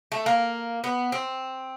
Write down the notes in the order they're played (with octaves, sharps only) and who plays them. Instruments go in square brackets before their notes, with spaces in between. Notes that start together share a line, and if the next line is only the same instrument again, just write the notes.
[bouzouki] A3
A#3
B3
C4